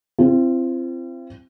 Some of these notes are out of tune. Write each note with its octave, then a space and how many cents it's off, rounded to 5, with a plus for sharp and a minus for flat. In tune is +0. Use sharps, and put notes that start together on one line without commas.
C4 +0 F4 -45